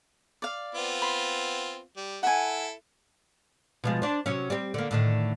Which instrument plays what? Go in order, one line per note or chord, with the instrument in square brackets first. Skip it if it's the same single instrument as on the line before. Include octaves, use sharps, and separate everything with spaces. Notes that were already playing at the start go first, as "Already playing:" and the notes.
[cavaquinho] D5 F5
[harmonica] B3 C4 F4
[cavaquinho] B5 C6
[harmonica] G3
[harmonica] E4 A4 [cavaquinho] F#5 G#5
[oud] B2 F3 G#3
D4 C5
C3 F#3 C#4
G3 C4
D3 A#3
A2 D3 D#3